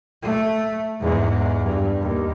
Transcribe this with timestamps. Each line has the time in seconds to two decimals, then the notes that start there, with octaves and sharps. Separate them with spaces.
0.22 A3
1.00 E2 G#2
1.64 G2
2.01 D#2